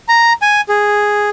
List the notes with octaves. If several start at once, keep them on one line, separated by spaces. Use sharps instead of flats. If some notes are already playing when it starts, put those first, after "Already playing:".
A#5
G#5
G#4